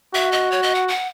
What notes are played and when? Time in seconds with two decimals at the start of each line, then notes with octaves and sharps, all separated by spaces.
0.14 F#4 E5
0.32 D#5
0.52 C#5
0.63 D#5
0.75 F#5
0.88 F#5